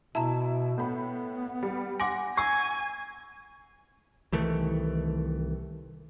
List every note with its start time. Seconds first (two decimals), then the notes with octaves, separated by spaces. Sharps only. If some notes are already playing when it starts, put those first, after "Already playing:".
0.15 B2 E4 A5 A#5
0.78 A2 B3 B5
1.63 G3
2.00 F#5 G#5 C6 D6 A#6
2.37 G#5 C#6 E6 C7
4.32 C2 D#3 E3 A3